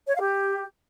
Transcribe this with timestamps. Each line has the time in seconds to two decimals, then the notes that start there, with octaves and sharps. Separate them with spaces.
0.08 C#5
0.14 F5
0.21 G4